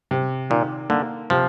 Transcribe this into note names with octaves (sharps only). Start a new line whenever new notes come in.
C3
A#2 D#3
D3 A#3
C3 F3